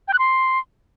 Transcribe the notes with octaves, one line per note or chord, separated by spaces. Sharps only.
G5
F#6
C6